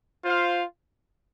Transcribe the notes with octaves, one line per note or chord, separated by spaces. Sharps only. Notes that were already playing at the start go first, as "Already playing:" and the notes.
F4 C5 F5